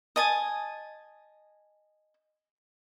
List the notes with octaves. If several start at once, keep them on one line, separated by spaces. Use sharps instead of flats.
D#5 G#5 A5